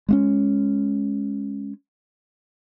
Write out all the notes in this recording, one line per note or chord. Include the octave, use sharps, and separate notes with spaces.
G#3 A#3 C#4